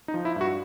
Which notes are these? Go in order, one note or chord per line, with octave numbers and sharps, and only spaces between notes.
D#4
F3
E4
G2 F#4